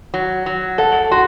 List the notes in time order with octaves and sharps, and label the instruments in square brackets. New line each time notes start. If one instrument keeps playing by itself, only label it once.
[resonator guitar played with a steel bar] F#3
F#3
[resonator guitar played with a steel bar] A4 [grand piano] F#5
[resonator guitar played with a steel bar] F#4 [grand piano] C6